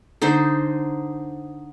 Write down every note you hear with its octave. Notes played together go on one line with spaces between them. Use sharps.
D3 D#4 C5